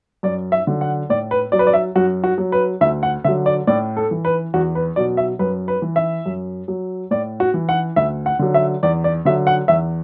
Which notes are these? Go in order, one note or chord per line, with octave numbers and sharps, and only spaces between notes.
F#2 D5
E5
D3 F#3
F#5
A2 D5
B4
F#3 D5
B4
D5
E5
F#2 F#4
F#4
F#3
B4
D2 E5
F#5
D3 F#3 E5
D5
A2 D5
A4
E3
B4
E2 F#4
B4
B2 F#3 D5
E5
F#2 B4
B4
E3
E5
F#2
F#3
A2 D5
F#4
E3
F#5
D2 E5
F#5
D3 F#3
E5
E2 D5
D5
D3 F#3 E5
F#5
E2 E5